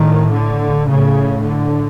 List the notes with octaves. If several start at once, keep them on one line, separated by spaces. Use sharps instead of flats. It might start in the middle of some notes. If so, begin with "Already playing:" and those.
Already playing: A2 D#3
D3
A2 C#3
D3